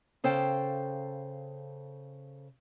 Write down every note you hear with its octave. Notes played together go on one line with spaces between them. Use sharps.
C#3 A4 C5 F5 G5